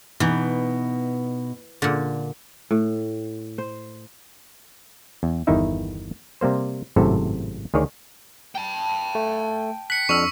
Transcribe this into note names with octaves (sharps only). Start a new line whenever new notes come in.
B2 E3 D#4
A#2 D3
A2
C5
E2
G1 E2 D#3 D#4 E4 E5
C3 G3 A#3 C5
G#1 F#2 A2 C3 A4
D2 D#3 G#4 C#5 D5
G5 A5
A3
F#6 B6 C#7
F2 D4 C#6 E6 F6